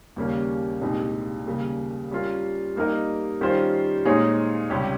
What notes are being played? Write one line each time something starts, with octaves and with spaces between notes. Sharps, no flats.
D#2 C#3 G3 A#3 C#4
C2 A#2 G#3 D#4 G4
D#2 C#3 G3 A#3
G3 C#4 F4 A#4
G3 A#3 D#4 A#4 D#5
D#3 G3 C#4 F4 C5
A#2 G#3 D#4 G#4 C#5
C#2 C3 G3 C#4 G4